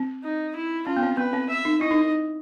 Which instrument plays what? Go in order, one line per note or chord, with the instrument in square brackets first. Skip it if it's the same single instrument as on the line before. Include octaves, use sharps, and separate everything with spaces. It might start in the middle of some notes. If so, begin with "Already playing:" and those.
Already playing: [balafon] C4
[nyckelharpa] D#4
E4
[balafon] C#4 [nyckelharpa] F4
[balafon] B3
C4
[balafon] B3 [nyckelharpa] B4
[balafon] C4
[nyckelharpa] E5
[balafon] D#4
[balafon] E4 [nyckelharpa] D#5
[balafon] D#4
D#4